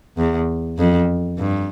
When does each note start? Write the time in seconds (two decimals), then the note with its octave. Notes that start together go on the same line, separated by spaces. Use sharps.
0.18 E2
0.78 F2
1.38 G2